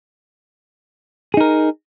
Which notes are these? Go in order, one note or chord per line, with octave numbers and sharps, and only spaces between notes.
D#4 G#4 A#4